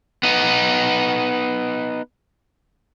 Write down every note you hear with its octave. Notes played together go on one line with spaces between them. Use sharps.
B3 D#4